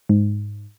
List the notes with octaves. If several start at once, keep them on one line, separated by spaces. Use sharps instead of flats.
G#2